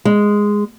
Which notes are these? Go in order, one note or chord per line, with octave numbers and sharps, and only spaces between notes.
G#3